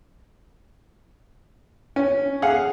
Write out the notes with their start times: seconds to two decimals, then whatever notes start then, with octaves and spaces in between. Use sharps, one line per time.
1.96 C#4
2.42 G#4 F5 F#5